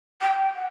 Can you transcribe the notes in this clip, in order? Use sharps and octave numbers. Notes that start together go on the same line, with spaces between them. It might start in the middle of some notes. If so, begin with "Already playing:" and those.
G5
F#5